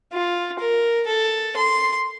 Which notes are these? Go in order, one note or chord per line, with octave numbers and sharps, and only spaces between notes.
F4
A#4
A4
C6